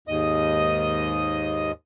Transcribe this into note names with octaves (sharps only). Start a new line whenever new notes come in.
D#2 G#2 D#5 D#6